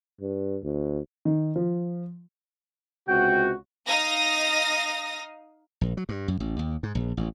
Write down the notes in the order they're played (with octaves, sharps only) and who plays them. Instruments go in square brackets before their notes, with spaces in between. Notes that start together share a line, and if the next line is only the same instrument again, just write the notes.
[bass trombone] G2
D2
[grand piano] D#3
F3
[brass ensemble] C#2 C3 F#4 [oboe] G5
[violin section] D#4 F5 D#6 A#6
[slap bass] A#1
F#3
G2
F#2
A1
D#2
G#2
A#1
A1